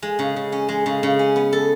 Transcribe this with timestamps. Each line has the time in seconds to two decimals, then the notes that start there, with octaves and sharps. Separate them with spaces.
0.02 G#3
0.19 C#3
0.36 C#3
0.52 C#4
0.69 G#3
0.86 C#3
1.03 C#3
1.19 C#4
1.36 B3
1.53 A4